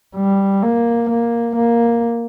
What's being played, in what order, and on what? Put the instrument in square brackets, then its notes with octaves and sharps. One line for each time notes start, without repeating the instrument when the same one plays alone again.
[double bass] G3
A#3
A#3
A#3